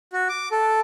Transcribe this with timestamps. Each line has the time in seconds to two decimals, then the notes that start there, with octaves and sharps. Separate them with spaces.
0.13 F#4
0.29 D6
0.52 A4